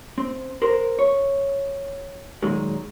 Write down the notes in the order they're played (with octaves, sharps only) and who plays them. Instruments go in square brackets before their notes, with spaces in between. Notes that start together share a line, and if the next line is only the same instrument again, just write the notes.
[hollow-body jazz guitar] C4
A#4 C5
C#5
A#2 D#3 F#3 G#3